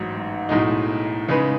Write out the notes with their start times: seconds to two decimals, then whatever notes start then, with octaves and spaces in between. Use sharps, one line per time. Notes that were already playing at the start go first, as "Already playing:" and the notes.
Already playing: A1 G#2 F#3
0.49 B1 A2 G#3 D#4
1.28 C#3 G#3 D#4 G#4 B4